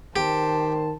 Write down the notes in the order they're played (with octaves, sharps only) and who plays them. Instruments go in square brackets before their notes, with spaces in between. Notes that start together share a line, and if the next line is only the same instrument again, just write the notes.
[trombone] D#3 [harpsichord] G4 [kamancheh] C5 A5